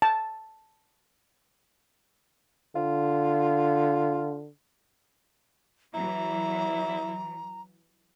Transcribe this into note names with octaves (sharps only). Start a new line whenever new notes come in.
A5
D3 F4
E3 F#3 E4 A#5